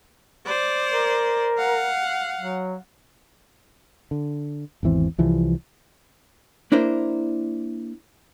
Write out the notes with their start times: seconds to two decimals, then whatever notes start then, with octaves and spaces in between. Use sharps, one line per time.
0.46 C5 D5
0.91 A#4
1.58 F5 F#5
2.37 F#3
4.11 D3
4.83 G#1 E2 E3 C4
5.18 C2 E3 F3 G3
6.72 A#3 D4 E4 A#4 C5